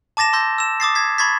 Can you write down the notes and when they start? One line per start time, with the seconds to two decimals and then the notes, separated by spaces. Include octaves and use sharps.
0.17 A5 D6 A6 A#6 E7
0.33 C6 E6 G6 A#6
0.58 E6 E7
0.80 D6 D#6 A6 C7
0.95 G#6 B6
1.18 B5 C#6 G#6 A6 B6